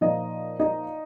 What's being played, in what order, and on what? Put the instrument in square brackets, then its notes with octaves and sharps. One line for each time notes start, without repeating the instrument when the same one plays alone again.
[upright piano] A#2 F3 D#4 D#5
D#4 D#5